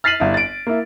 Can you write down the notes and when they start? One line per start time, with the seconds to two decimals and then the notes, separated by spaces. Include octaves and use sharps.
0.04 F6 A6 B6 C7 D#7 F#7
0.20 G1 E4
0.34 A6 D7
0.67 A#3 E4